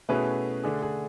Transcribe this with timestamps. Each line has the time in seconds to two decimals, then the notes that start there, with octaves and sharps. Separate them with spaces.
0.09 B2 A3 C#4 E4 G#4 B4
0.64 D3 A3 D4 G#4
0.82 G#4